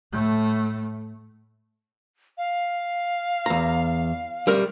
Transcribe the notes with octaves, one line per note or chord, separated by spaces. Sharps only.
A2 A3
F5
E2 A#5
G3 A#4